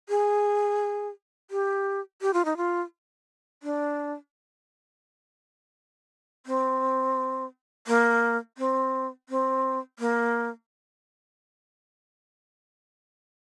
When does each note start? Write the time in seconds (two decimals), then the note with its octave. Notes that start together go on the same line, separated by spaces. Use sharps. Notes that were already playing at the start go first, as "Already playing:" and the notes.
0.09 G#4
1.51 G4
2.21 G4
2.33 F4
2.45 D#4
2.57 F4
3.63 D4
6.46 C4
7.87 A#3
8.58 C4
9.29 C4
9.99 A#3